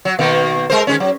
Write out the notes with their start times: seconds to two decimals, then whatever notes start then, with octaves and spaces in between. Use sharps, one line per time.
0.05 F#3
0.19 B2 D#3 A#3
0.70 G#3 A#4 C5
0.87 D#3 G#3 C#4
1.00 F#3